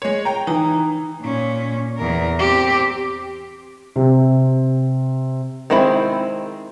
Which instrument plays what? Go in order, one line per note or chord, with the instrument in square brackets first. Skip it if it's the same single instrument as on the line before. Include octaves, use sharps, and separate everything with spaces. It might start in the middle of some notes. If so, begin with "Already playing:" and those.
[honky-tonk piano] G#3 C#5
G5 A#5
[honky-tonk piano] E3 [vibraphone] D#4 A#5
[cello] A#2 C#4
E2 A#4
C4 G4
[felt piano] C3
[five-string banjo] D#3 G#3 C4 E4 B5